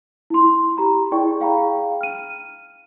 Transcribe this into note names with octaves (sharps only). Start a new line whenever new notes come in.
E4 C6
G4 A#5 B5
E4 G#4 D5 G5 C#6
G#4 F5 G5 A#5 B5
F6 D#7